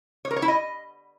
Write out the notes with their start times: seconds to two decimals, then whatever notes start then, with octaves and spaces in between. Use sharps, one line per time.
0.25 C#5
0.31 A#4
0.36 C#5
0.42 E4
0.48 D#5